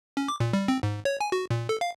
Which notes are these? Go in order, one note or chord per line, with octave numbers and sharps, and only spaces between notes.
C#4
D6
A#2
G3
C4
G#2
C#5
G#5
F#4
A#2
A4
F5